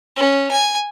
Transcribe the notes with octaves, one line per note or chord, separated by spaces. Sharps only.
C#4
G#5